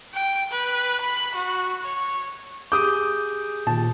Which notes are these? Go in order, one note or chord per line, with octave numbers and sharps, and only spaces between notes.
G5
B4
B5
F#4
C#5
G4 G#4 D6 D#6 G6
A#2 D#3 A5